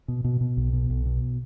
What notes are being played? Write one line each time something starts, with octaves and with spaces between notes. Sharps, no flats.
B2
B2
B2
B1
B2
B1
B2